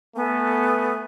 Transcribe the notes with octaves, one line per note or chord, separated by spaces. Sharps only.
A3 B3 A4 G#5